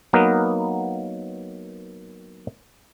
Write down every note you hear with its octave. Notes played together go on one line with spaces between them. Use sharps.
F#3 A#3 B3 D#4 A#4 B4